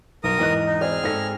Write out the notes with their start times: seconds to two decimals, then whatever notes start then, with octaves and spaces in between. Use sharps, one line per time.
0.24 B1 A#4 D#6
0.38 E2 G#2 D#5 G5 F#6
0.66 D#4
0.81 C4 G#4 D5 F6
1.04 G#2 A4 E6 A#6